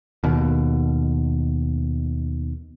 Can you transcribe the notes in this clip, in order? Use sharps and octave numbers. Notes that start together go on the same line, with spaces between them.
D#2 B2